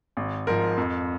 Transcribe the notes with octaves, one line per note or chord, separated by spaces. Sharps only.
G#1
G#2 F3 A#4
F2